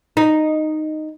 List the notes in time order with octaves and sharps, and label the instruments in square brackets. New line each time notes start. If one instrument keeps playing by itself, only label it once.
[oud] D#4